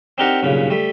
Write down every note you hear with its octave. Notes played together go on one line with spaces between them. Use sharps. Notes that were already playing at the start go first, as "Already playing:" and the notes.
C4 D4 D#4 G4 A#4 F#5
B1 G2 A#2 C#3
G3 A3